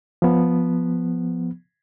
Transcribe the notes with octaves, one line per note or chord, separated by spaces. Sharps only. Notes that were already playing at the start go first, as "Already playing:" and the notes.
F3 B3